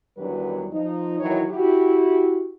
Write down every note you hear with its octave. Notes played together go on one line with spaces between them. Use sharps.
E2 D#3 F#3 G3 D4 B4
F3 D#4
D#3 E3 F#3 E4 C#5
E4 F#4 G4